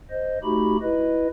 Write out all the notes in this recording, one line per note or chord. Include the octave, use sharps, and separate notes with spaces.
C5 D#5
A3 D#4 F#4 G4 B5
E4 B4 D#5